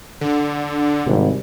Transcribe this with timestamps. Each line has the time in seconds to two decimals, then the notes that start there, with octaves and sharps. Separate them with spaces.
0.21 D3
1.06 G#1 C3 G3